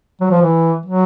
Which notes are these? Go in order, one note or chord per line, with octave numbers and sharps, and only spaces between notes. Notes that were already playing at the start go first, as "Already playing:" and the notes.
F#3
F3
E3
F#3